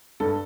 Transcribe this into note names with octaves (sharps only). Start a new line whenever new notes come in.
G2 A4